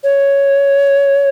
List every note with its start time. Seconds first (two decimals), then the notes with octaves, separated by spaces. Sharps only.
0.04 C#5